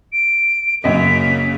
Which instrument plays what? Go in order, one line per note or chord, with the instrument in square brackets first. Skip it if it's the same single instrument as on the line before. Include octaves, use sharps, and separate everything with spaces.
[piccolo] D7
[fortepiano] F#2 D#5 [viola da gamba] C#3 A#3 [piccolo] B6